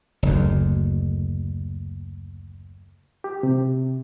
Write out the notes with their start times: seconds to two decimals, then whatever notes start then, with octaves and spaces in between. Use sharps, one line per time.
0.23 F#1 D2
3.24 G4
3.43 C3